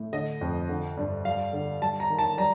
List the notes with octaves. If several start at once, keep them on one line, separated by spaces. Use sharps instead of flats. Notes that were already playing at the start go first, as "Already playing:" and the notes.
Already playing: A2
D3 D#5
F2
D3
G2
G3 F5
D3
G3 A5
A#5
D#3
A5
G3 A#5